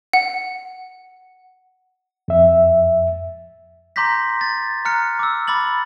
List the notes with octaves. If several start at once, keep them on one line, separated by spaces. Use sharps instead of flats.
F#5
F2 E5
A#5 C6 D6 G6 A#6 B6
A6
A#5 F6 F#6 C#7
D6 E6
B5 D6 A6 F#7